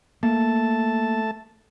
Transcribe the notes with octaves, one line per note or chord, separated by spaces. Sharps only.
A3 A#3 A5